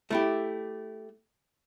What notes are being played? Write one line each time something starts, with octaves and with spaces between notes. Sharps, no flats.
A3 E4 G4